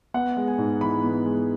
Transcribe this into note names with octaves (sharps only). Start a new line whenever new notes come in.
B3 F#5
G#3
G#5
G#2
E3 B5
B3
G#3